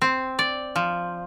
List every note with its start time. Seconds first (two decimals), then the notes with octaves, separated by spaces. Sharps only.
0.02 C4
0.39 D5
0.76 F3